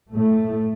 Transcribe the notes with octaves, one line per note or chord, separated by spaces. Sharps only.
A2 A3